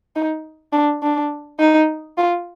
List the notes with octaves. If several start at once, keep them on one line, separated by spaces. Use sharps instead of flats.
D#4
D4
D4
D#4
F4